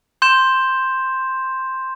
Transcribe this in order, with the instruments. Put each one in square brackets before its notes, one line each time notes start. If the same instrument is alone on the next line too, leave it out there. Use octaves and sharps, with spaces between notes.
[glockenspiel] C6 G6 E7